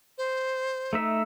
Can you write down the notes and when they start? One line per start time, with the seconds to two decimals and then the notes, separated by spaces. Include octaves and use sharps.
0.18 C5
0.93 A3 D#4 E5